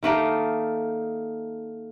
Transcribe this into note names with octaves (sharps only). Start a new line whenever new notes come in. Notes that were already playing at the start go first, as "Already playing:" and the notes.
D#3 A3 A#3 D#4